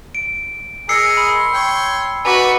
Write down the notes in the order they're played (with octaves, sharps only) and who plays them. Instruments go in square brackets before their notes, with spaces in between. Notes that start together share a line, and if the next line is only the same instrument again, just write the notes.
[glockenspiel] D7
[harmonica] G#4 A#4 D#5 [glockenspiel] E6 C7 C#7
[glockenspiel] B5 [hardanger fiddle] C6
[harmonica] C#5 G5
[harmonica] D#4 D5 [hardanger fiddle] F#4 B4 [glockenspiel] G#5